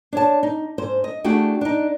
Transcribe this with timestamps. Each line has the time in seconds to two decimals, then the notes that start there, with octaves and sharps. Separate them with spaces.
0.13 D4 C#5 A5
0.43 D#4
0.78 G#2 C5
1.04 D#5
1.24 A3 D4 E4 F#4 G#4 G5
1.61 D4 D#4